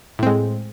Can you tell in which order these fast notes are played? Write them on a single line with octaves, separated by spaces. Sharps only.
A2 C4 G#3